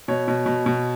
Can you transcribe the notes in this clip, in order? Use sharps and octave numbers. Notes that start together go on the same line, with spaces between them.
B2 C#5
B2
B2
B2